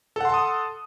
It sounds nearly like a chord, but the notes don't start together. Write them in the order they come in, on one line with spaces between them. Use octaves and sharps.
A4 F#5 C6 A5 D#6